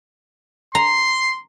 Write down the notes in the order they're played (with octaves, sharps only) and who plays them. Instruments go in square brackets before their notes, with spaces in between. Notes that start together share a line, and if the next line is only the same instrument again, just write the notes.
[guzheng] A#5 [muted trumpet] C6